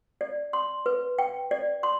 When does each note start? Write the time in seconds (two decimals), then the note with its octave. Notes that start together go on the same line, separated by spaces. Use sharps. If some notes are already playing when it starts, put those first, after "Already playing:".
0.21 D5
0.53 C6
0.86 B4
1.19 G5
1.51 D5
1.83 C6